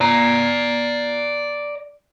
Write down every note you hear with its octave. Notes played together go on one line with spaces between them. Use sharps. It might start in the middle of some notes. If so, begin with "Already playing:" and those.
D5 A#5